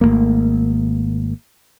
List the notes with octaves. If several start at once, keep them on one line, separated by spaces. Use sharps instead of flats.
G#1 A2 A3 A#3